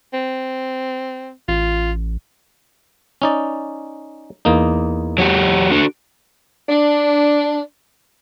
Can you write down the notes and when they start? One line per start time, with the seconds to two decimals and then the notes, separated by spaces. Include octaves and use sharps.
0.14 C4
1.48 A1 F4
3.22 C#4 D#4 D5
4.45 E2 A#3 D#4
5.18 F#3 F#4 G4
5.72 D4 F#4 A4
6.69 D4